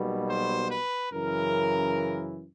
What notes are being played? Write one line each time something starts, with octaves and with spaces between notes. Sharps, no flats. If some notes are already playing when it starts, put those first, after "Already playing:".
Already playing: B1 B2 G3 A#3
C5
B4
F#2 C#3 E3 A#4